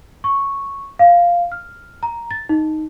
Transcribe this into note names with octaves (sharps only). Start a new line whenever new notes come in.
C#6
F5
F6
A#5
A6
D#4